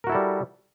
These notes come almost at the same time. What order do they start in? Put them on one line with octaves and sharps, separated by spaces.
A#4 F#4 E4 A4 G3